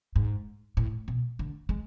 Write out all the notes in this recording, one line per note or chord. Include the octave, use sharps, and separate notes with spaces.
G#2
A2
B2
D3
G#3